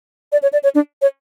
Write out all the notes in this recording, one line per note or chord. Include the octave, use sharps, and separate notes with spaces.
D5
C#5
D5
C#5
D4
C#5